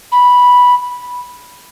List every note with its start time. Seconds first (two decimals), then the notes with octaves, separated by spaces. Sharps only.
0.12 B5